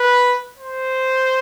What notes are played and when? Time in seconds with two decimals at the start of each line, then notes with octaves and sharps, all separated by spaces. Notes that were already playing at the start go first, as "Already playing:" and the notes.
Already playing: B4
0.57 C5